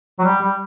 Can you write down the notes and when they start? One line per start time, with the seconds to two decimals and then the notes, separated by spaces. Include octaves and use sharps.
0.19 F#3
0.25 G3
0.42 G3